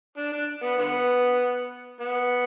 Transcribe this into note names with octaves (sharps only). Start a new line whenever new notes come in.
D4
D4
B3
D3 B3
B3